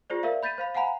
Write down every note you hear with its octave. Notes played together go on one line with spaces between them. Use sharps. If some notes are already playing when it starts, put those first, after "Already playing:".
F4 G#4 C5 D5
A#4 D5 E5 F5
B5 G6 A6 B6 D#7
C5 F5 B5
F5 F#5 G#5 A#5 B5